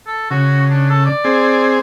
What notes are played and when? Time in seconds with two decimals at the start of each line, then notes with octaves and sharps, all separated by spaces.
0.07 A4
0.31 C#3 F#4
0.71 D4
0.90 A4
1.06 D5
1.24 C4 G#4